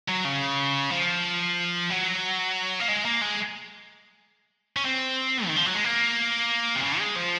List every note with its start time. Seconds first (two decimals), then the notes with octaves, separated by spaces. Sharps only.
0.08 F#3
0.25 C#3
0.90 F3
1.90 F#3
2.80 A#3
2.88 G#3
3.05 A#3
3.21 G#3
4.76 C#4
4.85 C4
5.46 D#3
5.56 F3
5.65 F#3
5.75 G#3
5.84 A#3
6.76 C3
6.83 C#3
6.99 G#3
7.16 F3